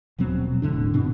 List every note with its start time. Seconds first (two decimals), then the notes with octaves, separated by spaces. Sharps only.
0.19 D#1 B2 F#3 C4
0.62 E1 A2 D3 D4
0.93 G2 B2 C4 D4